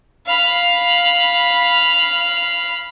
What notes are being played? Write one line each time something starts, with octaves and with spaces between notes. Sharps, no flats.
F5 B5